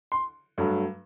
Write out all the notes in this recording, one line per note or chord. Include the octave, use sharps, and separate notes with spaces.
C6
G2 F#3 A3